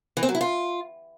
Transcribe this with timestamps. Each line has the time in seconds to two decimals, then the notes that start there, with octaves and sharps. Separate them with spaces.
0.17 E3
0.23 C4
0.29 F#3
0.35 E4
0.41 F4